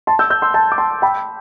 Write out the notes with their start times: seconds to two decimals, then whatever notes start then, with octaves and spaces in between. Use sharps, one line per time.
0.07 A5 C6
0.19 E6 G6
0.30 E6 G6
0.42 C6 E6
0.54 A5 C6
0.72 D6
0.78 A5 C6
1.02 G5 B5